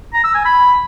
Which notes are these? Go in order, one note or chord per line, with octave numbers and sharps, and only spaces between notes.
A#5
E6
G#5
B5